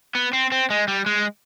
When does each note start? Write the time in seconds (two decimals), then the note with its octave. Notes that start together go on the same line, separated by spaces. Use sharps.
0.15 B3
0.33 C4
0.52 C4
0.70 G#3
0.88 G3
1.06 G#3